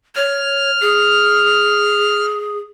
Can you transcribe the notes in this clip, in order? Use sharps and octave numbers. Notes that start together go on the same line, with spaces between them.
C#5 F6
G#4